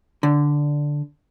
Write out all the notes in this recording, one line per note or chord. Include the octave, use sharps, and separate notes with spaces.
D3